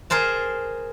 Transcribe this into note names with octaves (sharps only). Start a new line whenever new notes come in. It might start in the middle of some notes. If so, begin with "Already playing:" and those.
G#4 A#4 C5 A5